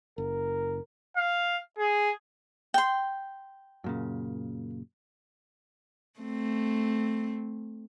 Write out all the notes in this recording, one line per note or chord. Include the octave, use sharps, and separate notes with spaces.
F#1 A#4
F5
G#4
G5 C6
F#2 A#2 C#3
A3 C4